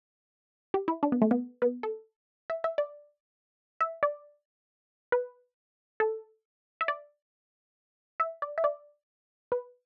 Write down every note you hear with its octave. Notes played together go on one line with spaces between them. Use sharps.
G4
E4
D4
B3
A3
B3
B3
A4
E5
E5
D5
E5
D5
B4
A4
E5
D5
E5
D5
E5
D5
B4